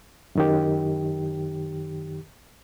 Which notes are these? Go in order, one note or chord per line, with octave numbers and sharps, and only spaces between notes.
F#2 D#3 G4